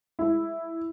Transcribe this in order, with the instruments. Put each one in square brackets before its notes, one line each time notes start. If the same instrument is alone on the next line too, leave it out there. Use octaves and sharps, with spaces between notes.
[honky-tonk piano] E4